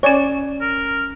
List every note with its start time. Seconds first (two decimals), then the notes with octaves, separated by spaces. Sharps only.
0.03 C#4 C#5 D5 G#5
0.61 A#4